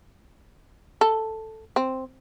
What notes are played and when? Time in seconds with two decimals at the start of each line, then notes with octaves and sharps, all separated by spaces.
1.01 A4
1.76 C4